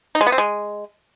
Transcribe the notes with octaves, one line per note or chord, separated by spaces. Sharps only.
D#4
G#3
B3
C4
G#3